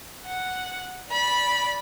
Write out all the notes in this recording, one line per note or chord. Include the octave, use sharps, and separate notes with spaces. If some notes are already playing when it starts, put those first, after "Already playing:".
F#5
D5 B5